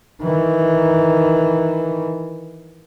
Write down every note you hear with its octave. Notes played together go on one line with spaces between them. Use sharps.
D#3 E3